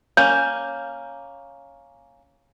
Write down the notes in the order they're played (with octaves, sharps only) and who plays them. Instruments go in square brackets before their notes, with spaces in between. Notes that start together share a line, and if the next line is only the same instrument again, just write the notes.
[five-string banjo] A#3 C#4 [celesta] G6